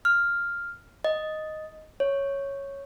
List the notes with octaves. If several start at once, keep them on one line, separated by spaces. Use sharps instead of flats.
F6
D#5
C#5